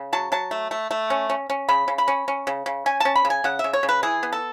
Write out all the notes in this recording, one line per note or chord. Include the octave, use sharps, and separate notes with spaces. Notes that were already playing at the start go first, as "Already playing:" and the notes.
Already playing: C#3
F#3 A5
F#3 A5
A3
A3
A3
C#4
C#4
C#4
C#3 B5
C#3
B5
C#4
C#4
C#3
C#3
C#4 G#5
C#4 A5
B5
C#3
G#5
C#3 F#5
E5
C#3
C#5
C#3
B4
E3 G#4
B3
A4